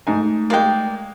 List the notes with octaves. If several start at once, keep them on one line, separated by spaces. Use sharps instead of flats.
G#2 A3 D#4 G#5
G#3 A#3 D5 G5